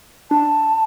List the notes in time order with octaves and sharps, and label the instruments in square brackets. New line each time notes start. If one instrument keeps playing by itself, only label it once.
[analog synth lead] D4 [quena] A5